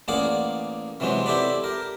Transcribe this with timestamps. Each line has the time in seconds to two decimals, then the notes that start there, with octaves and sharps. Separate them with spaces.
0.08 A1 A#3 G#4 D5 F#5 D6
1.00 C3 E3 F#3 G#3 C4
1.26 C4 E4 G4 A4 B4 D5
1.64 G4 A#4